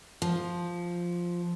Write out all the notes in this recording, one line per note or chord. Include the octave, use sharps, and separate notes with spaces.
F3